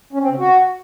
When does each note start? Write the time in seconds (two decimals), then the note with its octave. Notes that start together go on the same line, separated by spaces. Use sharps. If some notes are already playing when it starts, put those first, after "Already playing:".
0.13 C#4
0.21 C4
0.30 C#3
0.39 F#4